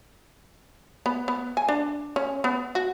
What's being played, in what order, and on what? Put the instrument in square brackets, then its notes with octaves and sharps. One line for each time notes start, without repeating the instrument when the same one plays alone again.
[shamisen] B3
B3
G#5
D4
C#4
B3
F#4